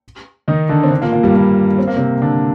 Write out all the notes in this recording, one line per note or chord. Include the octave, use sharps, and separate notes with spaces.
D#3 D#4
D3 D4
C4
D3 D4
A#2 A#3
A#2 A#3
G2 G3
A#2 A#3
C4
A#3
C3 C4
D3 D4